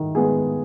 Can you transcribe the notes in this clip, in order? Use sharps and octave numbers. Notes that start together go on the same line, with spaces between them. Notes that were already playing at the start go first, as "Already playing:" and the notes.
Already playing: D#3
G#3 B3 G#4